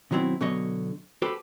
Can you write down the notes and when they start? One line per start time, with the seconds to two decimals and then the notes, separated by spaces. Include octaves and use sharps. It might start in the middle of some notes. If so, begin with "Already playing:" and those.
0.11 B2 D#3 F#3 G3 C4 E4
0.41 B2 D3 F#3 C#5 D#5
1.22 F#4 G4 A4 B4 C5